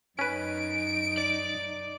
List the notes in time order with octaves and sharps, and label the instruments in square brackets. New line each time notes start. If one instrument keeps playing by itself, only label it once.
[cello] F#2 D#4 [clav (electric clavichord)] C#4 B4 [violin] D7
[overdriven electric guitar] D5